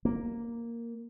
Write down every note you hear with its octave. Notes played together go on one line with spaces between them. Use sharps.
A#3